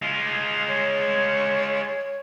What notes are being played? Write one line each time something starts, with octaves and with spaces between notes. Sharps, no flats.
G#3 F4
C#5